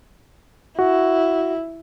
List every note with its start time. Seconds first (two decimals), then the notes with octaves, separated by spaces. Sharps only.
0.79 E4 F#4